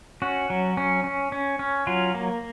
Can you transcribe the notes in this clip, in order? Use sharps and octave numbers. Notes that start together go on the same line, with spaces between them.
C#4 F#4
F#3
C#4
C#4
C#4
C#4
F#3 F4
A#3